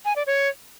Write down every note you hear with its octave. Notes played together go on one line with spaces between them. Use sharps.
G#5
D5
C#5